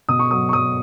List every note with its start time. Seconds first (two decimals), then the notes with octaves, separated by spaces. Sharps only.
0.08 B2 D#6
0.19 C#6
0.31 F#3 D#6
0.49 C#6
0.53 F#3 D#6